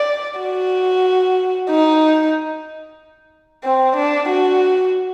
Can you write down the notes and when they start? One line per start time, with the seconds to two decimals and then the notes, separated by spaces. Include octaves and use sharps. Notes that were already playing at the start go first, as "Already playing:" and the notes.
Already playing: D5
0.40 F#4
1.70 D#4
3.64 C4
3.96 D4
4.30 F#4